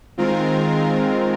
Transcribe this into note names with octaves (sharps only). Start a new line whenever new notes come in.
D#3 G#3 C4 F4 A#4